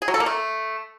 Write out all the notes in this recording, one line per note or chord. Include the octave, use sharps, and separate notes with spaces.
G#4
F#3
A4
A#3
A3